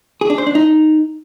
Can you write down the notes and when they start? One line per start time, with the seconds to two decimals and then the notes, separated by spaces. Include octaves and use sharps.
0.21 G#4
0.30 D4
0.38 C5
0.47 D4
0.55 D#4